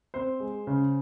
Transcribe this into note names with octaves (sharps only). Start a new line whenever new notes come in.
C4 C5
G#3
C#3